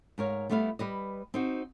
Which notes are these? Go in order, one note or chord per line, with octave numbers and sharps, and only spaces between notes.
G#2 A#4 C#5 F5
G3 A3 B3 E4 E5 F5
G3 B4 D#5
C4 D#4 F#4